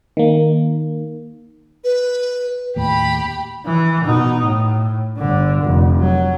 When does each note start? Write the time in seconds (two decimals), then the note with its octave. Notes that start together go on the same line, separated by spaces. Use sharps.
0.17 D#3 A#3
1.84 B4
2.76 D#2 A2 G4 B5
3.66 E3
4.05 B2 D#4
4.43 A2
5.17 G1 D3
5.62 F1
6.00 F#3